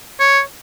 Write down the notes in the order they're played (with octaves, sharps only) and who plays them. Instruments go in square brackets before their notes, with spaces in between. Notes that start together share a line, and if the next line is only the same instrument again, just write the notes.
[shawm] C#5